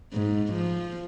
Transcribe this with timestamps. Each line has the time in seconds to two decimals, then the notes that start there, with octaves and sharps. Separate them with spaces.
0.13 G#2
0.53 F3